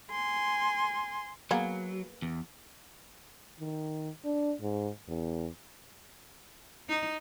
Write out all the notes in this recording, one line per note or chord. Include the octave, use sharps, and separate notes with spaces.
G#5 C6
F#3 A#3 B3 G#4
E2
D#3
D4
G#2
E2
D#4